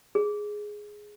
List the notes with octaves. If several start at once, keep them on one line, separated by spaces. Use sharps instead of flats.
G#4